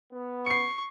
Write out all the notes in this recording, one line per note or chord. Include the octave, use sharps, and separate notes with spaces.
B3
C#6 C7 C#7